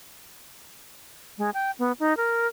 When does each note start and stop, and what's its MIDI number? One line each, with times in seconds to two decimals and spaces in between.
1.38 1.50 56
1.54 1.71 79
1.79 1.92 59
2.00 2.16 63
2.17 2.47 70